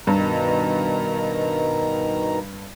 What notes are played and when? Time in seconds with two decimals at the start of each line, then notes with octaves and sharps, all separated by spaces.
0.07 G2 B2 D#3 A#5